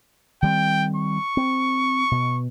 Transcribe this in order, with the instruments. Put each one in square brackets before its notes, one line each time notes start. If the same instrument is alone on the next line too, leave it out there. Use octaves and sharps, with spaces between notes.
[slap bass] D#3 G3 C4 [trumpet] G5
[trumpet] C#6
[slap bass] C4
B2